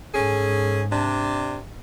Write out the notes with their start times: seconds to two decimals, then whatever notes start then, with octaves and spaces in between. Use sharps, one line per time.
0.14 G#2 C#4 G#4 A4
0.92 C3 D4